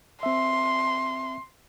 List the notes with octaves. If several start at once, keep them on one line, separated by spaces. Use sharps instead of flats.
C4 E5 C6